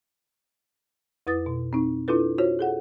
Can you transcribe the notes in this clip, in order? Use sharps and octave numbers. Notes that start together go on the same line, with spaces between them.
F2 E4 B4 D#6 A6
B2
C4 D#4
D4 E4 F4 A4 B4
F4 F#4 C5 C#5
G#4 A4 F#5